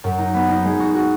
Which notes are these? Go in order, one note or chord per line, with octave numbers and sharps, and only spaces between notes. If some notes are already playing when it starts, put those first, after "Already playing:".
F#2
D#4
B3
D#4
G#3
F#4
F#4